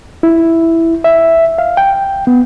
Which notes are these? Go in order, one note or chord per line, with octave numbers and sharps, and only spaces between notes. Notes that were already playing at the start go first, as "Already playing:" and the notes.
E4
E5
F5
G5
B3